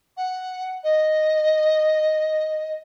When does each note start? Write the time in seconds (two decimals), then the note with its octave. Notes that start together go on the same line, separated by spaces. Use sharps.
0.16 F#5
0.83 D#5